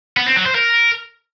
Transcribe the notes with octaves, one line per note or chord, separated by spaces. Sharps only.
B3
C4
F#3
C5
A#4